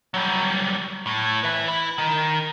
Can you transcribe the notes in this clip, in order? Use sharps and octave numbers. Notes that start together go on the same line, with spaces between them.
F#3 G3
A2
B4 E5
E4
D#3